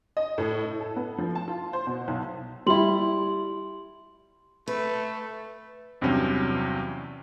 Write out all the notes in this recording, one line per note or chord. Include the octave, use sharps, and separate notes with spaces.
D#5
A2
E4
A4
B3
F3
A5
F4
C5
B2
B1
G3 E4 G4 C6 F#7
A3 B4
E2 G2 C3 F#3 C4 C#4